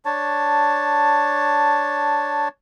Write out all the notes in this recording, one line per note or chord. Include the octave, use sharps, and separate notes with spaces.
D4 C#5 A5